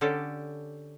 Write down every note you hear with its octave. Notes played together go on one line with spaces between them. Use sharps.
D3 C#4 G4 A4